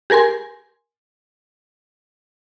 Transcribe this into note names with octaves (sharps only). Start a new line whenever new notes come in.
G4 G#4 A#4 G#5 C6